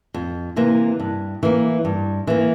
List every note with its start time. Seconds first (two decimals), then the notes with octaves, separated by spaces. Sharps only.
0.14 F2
0.56 C3 E3 A#3
1.00 G2
1.43 E3 A#3
1.85 G2
2.27 E3 A#3